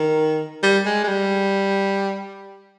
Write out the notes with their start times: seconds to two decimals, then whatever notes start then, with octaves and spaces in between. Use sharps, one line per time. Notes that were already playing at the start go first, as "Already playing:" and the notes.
Already playing: D#3
0.63 G3
0.85 G#3
1.04 G#3
1.08 G3